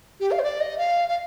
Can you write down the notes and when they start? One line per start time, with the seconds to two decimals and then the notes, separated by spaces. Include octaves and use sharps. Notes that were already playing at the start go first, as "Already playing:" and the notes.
0.20 G4
0.31 F5
0.39 C5
0.44 D5
0.60 D#5
0.78 F5
1.09 F5